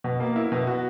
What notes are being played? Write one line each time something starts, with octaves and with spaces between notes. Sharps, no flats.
B2
A#3
E4
B2
F#4